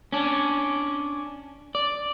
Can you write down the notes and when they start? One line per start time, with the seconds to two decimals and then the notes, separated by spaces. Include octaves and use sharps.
0.12 C#4 D4
1.75 D5